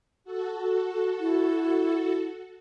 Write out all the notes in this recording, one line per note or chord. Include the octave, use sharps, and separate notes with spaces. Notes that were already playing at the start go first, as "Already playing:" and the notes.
F#4 A4
E4